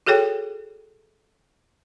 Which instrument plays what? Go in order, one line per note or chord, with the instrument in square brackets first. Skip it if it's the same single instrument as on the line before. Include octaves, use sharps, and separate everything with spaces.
[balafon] F#4 G#4 A4 C#5 G5